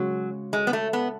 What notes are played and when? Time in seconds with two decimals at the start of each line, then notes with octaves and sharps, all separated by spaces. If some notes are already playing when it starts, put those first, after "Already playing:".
Already playing: C#3 F#3 G#3 C#4 F#4
0.53 G#3
0.67 B3
0.73 A3
0.93 B3